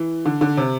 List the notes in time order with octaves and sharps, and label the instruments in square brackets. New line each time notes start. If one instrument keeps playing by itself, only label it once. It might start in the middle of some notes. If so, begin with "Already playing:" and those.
Already playing: [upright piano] E3
D3
D3
C3